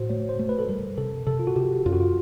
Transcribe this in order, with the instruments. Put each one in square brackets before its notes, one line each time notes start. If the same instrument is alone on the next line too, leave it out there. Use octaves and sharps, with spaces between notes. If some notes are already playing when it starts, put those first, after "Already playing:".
Already playing: [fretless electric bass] A2 [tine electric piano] F#4 C5
[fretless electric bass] A3 [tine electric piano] C#5
[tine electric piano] C5
[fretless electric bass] A3
[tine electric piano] B4
A4
[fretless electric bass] G3 [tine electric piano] A#4
[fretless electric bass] C3 [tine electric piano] A4
[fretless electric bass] C3 [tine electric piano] A4
[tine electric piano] F4
F#4
[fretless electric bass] C3 [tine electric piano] G4
[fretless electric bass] F#2 [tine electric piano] F4
[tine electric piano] F#4
F4